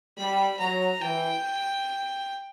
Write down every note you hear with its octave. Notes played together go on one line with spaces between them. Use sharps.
G3 B5
F#3 A#5
E3 G5